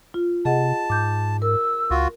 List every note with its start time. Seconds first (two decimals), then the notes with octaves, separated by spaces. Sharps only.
0.14 F4
0.45 C3 G#4 D#5 F#5 A5
0.90 G#2 D6 G6
1.42 A#4 E6
1.90 C#2 F4 F#4